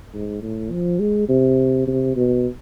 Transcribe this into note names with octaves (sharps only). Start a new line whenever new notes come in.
G#2
A2
F3
G#3
C3
C3
B2